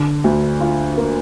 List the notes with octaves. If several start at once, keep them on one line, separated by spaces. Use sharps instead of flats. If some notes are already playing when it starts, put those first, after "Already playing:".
Already playing: D3
D2
F4
A#3